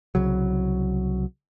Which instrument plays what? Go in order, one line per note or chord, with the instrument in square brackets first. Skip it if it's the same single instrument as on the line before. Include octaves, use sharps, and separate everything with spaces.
[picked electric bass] C2 C#3 F#3